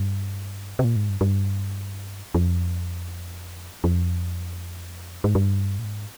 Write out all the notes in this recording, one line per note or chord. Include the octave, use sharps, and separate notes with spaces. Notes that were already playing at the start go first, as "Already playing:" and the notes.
Already playing: G2
C3
A#2
G#2
G2
G2
F2
F2
G#2
G2
A#2
G#2